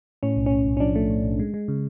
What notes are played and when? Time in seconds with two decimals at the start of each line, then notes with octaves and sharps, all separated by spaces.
0.23 A2 C#4
0.37 B1
0.46 C#4
0.52 A2
0.66 B1
0.77 C#4
0.80 F3 D4
0.95 A3
1.10 A2
1.25 B1
1.39 G#3
1.54 G#3
1.68 C#3